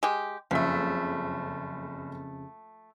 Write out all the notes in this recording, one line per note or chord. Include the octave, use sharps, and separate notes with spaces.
G#3 G4
F#1 F2 C#3 F3 A3 B6